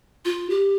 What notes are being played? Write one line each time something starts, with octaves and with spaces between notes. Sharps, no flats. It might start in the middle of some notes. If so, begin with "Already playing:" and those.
F4
G4